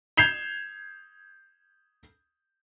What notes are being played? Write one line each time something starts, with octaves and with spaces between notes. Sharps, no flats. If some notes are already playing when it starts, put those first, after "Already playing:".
G6 G#6 C7 E7 F7 G7